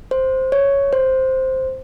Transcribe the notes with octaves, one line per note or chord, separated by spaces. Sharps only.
C5
C#5
C5